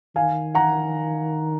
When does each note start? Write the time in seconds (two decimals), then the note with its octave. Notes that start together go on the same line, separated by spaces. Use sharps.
0.16 D#3 F5 G#5
0.55 F#5 A#5